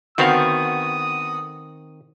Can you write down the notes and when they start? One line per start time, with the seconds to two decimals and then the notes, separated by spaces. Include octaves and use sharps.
0.18 D3 D#3 B3 C4 F#4 F5 D#6